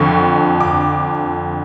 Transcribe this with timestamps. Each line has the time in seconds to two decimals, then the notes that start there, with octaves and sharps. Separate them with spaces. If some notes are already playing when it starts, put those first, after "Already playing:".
Already playing: F2 D3 F3 C#6
0.60 D6